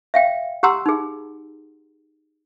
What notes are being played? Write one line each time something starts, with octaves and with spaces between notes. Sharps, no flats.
E5 F5 G5
G4 F#5 A#5 C6 E6
D#4 G#4